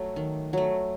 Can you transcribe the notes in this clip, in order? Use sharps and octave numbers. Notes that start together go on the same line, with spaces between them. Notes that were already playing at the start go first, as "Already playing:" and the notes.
Already playing: F#3 A3
D#3
F#3 A3